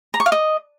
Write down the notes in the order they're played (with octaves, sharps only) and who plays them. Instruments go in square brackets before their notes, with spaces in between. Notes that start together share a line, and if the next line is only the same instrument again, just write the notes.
[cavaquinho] A#5
C#6
F5
D#5